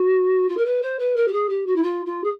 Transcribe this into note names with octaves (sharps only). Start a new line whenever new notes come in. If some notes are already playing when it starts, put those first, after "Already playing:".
Already playing: F#4
F4
A#4
B4
C5
B4
A#4
G4
G#4
G4
F#4
E4
F4
F4
G#4